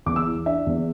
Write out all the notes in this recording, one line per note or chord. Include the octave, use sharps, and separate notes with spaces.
E2 D6
E6
E3
D4 E5
E2